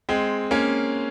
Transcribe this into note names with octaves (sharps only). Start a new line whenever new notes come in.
G#3 C4
A#3 C#4